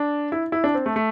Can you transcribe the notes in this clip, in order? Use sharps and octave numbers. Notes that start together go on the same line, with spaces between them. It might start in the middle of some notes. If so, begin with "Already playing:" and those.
Already playing: D4
E4
E4
D4
C4
A3
A3